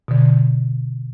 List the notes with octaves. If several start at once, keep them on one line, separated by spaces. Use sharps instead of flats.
B2 D3